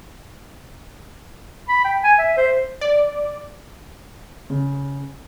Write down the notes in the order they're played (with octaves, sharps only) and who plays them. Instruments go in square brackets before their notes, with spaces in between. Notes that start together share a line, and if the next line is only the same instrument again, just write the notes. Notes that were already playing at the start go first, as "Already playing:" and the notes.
[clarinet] B5
G5
G#5
E5
C5
[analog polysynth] D5
[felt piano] C#3